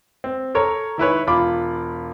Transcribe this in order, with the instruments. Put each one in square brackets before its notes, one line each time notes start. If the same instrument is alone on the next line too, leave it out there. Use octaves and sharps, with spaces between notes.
[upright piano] C4
A4 A#4 C#5
D#3 E4 B4 C#5
E1 F4 B5 D6